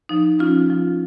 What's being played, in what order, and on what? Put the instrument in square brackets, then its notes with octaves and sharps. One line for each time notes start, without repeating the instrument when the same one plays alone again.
[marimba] F3 D#4
F3 C#4 F4
F3